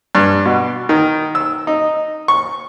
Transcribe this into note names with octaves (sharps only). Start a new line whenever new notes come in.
G2
B2
D#3
E6
D#4
C#6